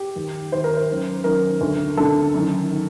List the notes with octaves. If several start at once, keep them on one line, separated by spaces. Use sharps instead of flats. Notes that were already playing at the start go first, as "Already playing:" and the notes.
Already playing: G4
D#2 D#3
D#2 D#3 C5
A#4
C5
F#2 D#3
F#2 D#3 A#4
D2 D3
D2 D3 A4
F#2 D#3
D#3